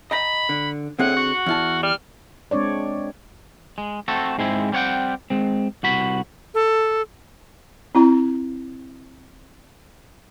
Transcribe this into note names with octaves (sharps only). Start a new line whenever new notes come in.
D#5 G5 A#5 B5
D3
A2 D3 C4 G#4 F#5
F#4
E2 E4 A5 F6
G3 F6
G#3 C4 D4 C#5 D5
G#3
A3 C4 F#4 A4
G#2 G#3 C4 E4
G3 C4 C#5 F#5 G5
G#3 C4
C2 F#4 B5
A4
C4 E4 A#5